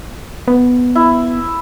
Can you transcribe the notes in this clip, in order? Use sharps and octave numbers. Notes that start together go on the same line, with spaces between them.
B3
E4